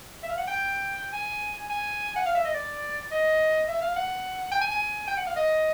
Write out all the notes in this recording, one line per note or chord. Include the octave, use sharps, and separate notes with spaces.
E5
F5
F#5
G5
G#5
G#5
F#5
F5
E5
D#5
D5
D#5
E5
F5
F#5
G5
G#5
G#5
G5
F#5
F5
D#5